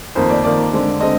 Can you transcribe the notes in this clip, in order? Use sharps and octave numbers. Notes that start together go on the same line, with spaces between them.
F2 D#3 A#3 C5
D5
F2 D#3 A#3 D5
D3 G#3 C4
D3 G#3 C4 D#5